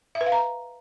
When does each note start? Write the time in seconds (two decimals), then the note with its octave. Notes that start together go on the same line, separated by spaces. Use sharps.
0.15 E5
0.21 B4
0.26 F5
0.32 A#5